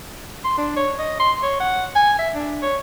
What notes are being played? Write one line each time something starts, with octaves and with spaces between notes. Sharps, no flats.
C6
D4
C#5
D#5
C6
C#5
F#5
G#5
E5
D4
C#5